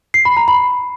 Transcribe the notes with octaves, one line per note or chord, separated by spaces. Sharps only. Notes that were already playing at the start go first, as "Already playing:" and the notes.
C7
B5
A#5
B5